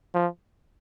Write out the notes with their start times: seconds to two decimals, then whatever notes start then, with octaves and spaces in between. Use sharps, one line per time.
0.14 F3